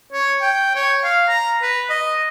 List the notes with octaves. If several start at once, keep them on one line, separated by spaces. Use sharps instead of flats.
C#5
G5
C#5
F5
A#5
B4
D#5